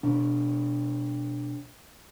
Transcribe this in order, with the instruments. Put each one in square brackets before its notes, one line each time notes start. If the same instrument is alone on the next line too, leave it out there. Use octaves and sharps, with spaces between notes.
[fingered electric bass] B2 D4